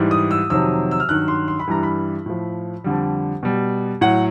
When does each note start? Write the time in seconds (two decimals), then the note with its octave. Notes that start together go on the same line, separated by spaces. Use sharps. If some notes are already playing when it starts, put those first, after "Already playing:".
Already playing: G#2 E3 G3
0.11 D#6
0.31 E6
0.50 F2 C3 D#3 F#3 E6
0.91 E6
1.00 F6
1.09 G2 D#3 F#3 F#6
1.28 C6
1.48 C6
1.59 B5
1.67 G2 E3 G3 A#5
1.83 B5
2.26 A2 F3
2.84 F2 D3 G3
3.43 B2 G3
4.01 A2 F#3 F#5